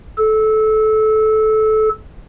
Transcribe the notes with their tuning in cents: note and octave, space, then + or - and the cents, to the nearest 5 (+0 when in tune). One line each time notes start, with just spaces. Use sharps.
A4 -20